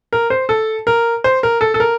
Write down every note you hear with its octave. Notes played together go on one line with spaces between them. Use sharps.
A#4
C5
A4
A#4
C5
A#4
A4
A4
A#4